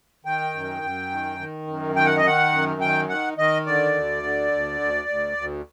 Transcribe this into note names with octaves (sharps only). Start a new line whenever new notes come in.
D#3 G5
F#2
F#2
D#3
D#3
F#2
D#3 G5
F#5
D#5
D#3 F#5
F#2
D#3 G5
D#3 F#5
D#3 D#5
D3 D5
D2
D3
D2
D2
D2
D2